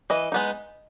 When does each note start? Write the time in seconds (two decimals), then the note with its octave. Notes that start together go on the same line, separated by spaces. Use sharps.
0.10 E3 D#5
0.32 G#3 B3 D#4